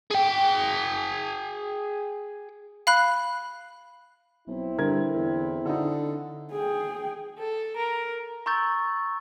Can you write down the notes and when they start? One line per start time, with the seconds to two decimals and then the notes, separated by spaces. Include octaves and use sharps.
0.11 G#4 G5
2.87 F5 B5 F#6
4.47 B1 C4 E4
4.78 G2 D3 A#4 G#6
5.15 E2
5.65 D3 D#4 A4
6.52 G#4 G5
7.39 A4
7.76 A#4
8.46 A#5 C6 C#6 E6 G6 A6